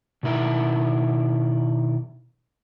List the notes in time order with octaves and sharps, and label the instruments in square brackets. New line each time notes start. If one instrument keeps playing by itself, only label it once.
[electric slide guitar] B2 D#3 E4 A#4